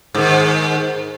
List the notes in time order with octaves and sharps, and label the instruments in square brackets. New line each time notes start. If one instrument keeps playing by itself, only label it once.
[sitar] G#2 D#3